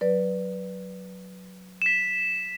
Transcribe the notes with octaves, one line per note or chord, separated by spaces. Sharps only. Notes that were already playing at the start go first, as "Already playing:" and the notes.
F#3 B4 D5
B6 E7